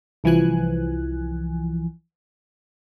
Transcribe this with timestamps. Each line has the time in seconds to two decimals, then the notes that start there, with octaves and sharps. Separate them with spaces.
0.24 C2 E3 F3 G#5 F#6